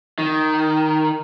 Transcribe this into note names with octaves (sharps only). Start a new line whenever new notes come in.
D#3